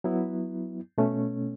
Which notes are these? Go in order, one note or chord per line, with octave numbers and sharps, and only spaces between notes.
F#3 B3 E4
B2 A3 C#4